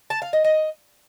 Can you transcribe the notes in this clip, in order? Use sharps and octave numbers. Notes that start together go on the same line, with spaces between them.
A5
F5
D#5
D#5